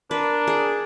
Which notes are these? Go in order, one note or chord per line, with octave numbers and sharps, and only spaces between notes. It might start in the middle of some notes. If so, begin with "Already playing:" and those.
D4 A#4 B4
G#4